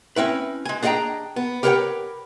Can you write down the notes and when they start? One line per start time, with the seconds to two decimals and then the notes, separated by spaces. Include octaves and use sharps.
0.16 C4 C#4 E4 B4
0.65 G#3 G#5
0.82 D4 G#4 D#5 F5 G5 A#5
1.36 B3
1.63 G4 A#4 B4 C#5 F#5 G5